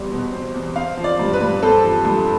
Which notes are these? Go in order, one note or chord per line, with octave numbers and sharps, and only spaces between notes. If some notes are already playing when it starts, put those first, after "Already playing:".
Already playing: E2 B2 G3 C4
B2
C4
E2
C4 F5
F3
D5
G2
B4
G2
C4 A4
F3
G2